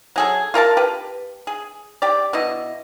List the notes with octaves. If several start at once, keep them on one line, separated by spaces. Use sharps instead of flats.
F#3 G#4 A4
F4 A#4 E5 A5
G4 B4
G#4
G4 D5
B2 E4 D#5